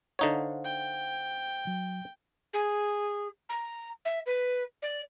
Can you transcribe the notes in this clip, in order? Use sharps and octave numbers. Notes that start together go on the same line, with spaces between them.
D3 D#4 C5 C#5 F5 F#5
G5
F#3
G#4
A#5
E5
B4
D5